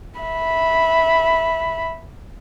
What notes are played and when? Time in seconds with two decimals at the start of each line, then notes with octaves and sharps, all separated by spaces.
0.20 E5 B5